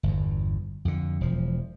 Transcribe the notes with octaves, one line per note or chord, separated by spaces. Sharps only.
G1 E2
F2 D3
E1 F3